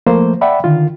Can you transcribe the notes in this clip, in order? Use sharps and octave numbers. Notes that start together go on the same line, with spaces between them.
F3 A3 A#3 C5
D5 E5 F#5 G5 B5
D3 D#3 F4